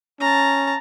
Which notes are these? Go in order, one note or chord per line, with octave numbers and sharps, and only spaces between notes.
C#4 A5 A#5